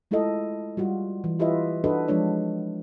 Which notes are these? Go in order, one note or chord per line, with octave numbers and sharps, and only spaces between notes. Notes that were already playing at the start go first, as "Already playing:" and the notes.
G#3 A3 E4 F4 A4 D#5
G3 F4 F#4
E3
E4 F4 G4 B4 D#5 E5
D4 D#4 F#4 A4 B4 D#5
F3 G#3 D4 C#5 D5